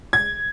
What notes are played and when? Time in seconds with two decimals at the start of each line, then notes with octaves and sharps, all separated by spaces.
0.13 G#6